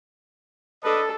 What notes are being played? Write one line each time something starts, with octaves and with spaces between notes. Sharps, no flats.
D4 A4 B4 D#5